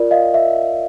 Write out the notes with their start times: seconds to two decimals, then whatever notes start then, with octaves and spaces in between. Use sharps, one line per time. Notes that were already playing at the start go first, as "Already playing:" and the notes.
Already playing: F4 A#4 D5
0.11 D#5 F5
0.34 E5